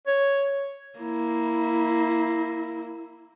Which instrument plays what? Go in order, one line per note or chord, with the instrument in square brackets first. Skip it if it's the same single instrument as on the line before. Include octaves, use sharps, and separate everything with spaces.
[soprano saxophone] C#5
[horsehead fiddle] A#3 E4